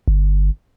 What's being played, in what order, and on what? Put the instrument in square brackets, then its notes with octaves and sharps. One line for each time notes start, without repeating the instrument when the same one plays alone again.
[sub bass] G1